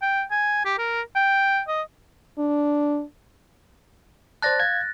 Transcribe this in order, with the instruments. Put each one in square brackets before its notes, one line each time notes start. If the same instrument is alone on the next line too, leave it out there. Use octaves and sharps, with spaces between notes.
[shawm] G5
G#5
G4
A#4
G5
D#5
[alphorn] D4
[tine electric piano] C5 D5 A5 [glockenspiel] F#6 A6 A#6
[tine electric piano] F5 G#6